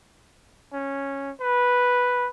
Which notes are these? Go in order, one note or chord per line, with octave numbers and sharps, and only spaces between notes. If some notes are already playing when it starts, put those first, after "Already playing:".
C#4
B4